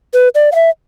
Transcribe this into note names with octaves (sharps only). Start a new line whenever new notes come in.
B4
D5
F5
E5